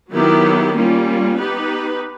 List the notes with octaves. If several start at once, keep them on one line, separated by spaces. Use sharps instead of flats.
D#3 F#3 B3 E4 G4
G3 A#3 C#4 F4
B3 D#4 G4 B4